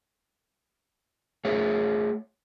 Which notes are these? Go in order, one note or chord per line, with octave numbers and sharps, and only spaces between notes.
A3 G#4 C#5 E5